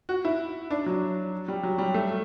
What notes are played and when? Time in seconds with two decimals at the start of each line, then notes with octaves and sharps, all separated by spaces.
0.09 F#4
0.25 E4
0.71 D4
0.86 F#3
1.48 G3
1.63 F#3
1.78 G3
1.94 A3